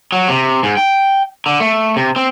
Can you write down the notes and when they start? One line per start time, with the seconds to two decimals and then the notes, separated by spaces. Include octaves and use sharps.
0.12 F#3
0.28 C3
0.63 G#2
0.77 G5
1.46 D3
1.60 A3
1.96 C3
2.16 C4